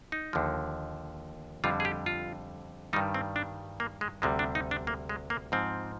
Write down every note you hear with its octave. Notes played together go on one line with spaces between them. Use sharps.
D#4
D#2 D3 F3
F2 D3 G3 F4
G#4
G4
F4
G2 D#3 G3 D#4
C4
D4
A#3
G#3
D2 C3 G3 G#3
D4
D#4
D4
A#3
G#3
A#3
G#2 F3 C4